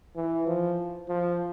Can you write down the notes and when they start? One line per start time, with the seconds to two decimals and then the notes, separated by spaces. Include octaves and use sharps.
0.16 E3
0.47 F3
1.09 F3